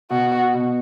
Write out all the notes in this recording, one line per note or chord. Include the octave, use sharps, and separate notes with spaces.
B2 F#4
B2